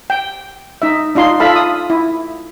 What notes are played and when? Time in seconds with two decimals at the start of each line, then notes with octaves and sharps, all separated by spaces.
0.10 G5
0.82 D#4 E5
1.15 D4 D#4 F4 C6
1.40 F4 A4 E5 F5 A5 B5
1.56 D#6
1.90 E4